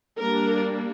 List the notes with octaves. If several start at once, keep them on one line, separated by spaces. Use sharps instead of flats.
G3 A#3 D4 A#4